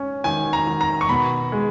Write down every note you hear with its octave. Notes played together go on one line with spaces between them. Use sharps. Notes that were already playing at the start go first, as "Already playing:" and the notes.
Already playing: C#4
D#3 G#5
A#5
D#3
A#5
C#6
B2 B5
G#3